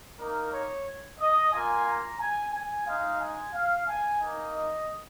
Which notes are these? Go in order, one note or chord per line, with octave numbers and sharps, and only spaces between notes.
A#3 D#4 A#4
C#5
D#5
A#3 F4 G#5
A#5
G#5
G#5
G#3 D#4 F5
G#5
F5
G#5
A#3 D#4
D#5